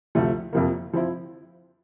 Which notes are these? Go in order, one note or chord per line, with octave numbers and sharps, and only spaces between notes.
D2 C3 F3 A3
F2 C3 F3 A#3
F3 C4 E4